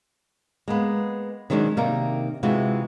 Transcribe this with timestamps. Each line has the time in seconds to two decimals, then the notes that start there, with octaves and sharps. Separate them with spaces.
0.68 G#3 A#3 B3
1.50 D#3 F#3 G#3 C#4 D4
1.77 C3 D#3 A#3 D4 D#4 A#4
2.43 C3 E3 G#3 F4 F#4